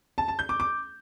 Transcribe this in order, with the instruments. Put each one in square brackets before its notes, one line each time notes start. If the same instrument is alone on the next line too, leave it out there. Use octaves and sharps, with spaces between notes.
[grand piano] A5
A5
G6
D6
D6